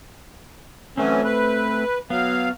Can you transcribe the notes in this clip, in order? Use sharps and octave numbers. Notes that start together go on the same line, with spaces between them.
E3 F#3 A3 C4 C#4
B4
F#3 B3 F5